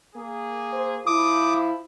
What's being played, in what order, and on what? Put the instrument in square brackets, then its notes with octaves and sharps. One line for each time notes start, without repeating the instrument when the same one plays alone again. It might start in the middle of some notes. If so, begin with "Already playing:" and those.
[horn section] A#3 G#4
[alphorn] C5
[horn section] F3 [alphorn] E4 [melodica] D6 D#6